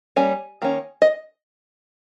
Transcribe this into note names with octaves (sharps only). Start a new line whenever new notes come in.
G3 A#3 C#4 G#5
D#3 A#3 C#4
D#5